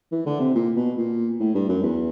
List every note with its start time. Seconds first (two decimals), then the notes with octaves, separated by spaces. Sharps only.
0.12 E3
0.26 D3
0.40 C3
0.55 A#2
0.76 B2
0.97 A#2
1.40 A2
1.55 G2
1.69 F#2
1.83 E2